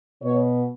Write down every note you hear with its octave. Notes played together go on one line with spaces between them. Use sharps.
B2 C#5